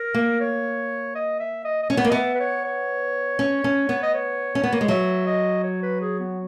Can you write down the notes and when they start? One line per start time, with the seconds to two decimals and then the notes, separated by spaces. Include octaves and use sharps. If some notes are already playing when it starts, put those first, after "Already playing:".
Already playing: A#4
0.14 A#3
0.40 C#5
1.15 D#5
1.39 E5
1.64 D#5
1.83 D#5
1.90 C#4 C#5
1.97 B3
2.05 A#3
2.09 D#5
2.12 B3 E5
2.35 B4
2.40 C#5
2.64 C#5
3.39 C#4
3.64 C#4
3.89 B3
4.03 D#5
4.14 C#5
4.55 C#4
4.64 B3
4.73 A#3
4.81 G#3
4.88 F#3 E5
5.27 D#5
5.63 C#5
5.83 B4
6.01 G#4
6.19 B3